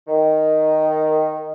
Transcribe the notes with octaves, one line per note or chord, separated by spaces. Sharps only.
D#3